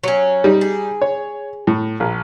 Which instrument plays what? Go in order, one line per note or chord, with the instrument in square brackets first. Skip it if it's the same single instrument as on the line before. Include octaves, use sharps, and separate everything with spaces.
[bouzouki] F#3 C#4
[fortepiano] G3 D#4
[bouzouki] G#4
[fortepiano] C#5
A2
A#1